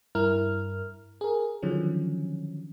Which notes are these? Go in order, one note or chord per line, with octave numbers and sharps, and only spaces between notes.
G2 E4 A#4 F6
G#4 A#4
D3 D#3 F3 F#3 C#4